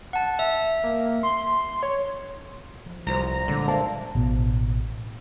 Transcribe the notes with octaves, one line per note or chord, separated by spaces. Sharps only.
F#5 A5
E5
A#3
C6
C#5
F3
C2 G3 F4 C5 A#5
A#2 D3 G#3 D5
A#3 C5 E5 A5
A1 B2